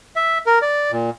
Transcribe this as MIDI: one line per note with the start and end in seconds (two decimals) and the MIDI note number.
0.16 0.38 76
0.46 0.59 70
0.62 0.91 74
0.92 1.10 46